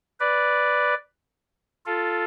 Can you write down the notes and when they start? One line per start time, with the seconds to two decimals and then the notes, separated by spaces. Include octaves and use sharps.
0.20 B4 D5
1.86 F4 A4